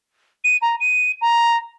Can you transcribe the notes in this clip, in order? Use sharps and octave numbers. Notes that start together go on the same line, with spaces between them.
D#7
A#5
D#7
A#5